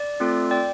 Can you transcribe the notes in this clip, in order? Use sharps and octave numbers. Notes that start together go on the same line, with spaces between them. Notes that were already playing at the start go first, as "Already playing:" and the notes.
Already playing: D5
A3 C4 F4 A4
D5 G5